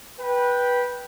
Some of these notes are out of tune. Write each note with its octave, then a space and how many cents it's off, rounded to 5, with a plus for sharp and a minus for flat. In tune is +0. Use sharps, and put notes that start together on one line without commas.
B4 -15 G5 +0